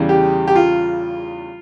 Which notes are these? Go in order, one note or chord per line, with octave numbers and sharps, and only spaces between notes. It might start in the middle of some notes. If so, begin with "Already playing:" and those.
Already playing: E2 C#3 G3
G4
G4
F4